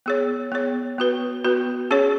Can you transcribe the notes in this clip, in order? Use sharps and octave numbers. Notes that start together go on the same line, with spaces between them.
B3 G#4 C#5
B3 G#4 C#5
B3 F#4 B4
B3 F#4 B4
C#4 G#4 C#5